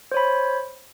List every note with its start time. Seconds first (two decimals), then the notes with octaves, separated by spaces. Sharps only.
0.12 C5
0.14 C#5
0.17 B5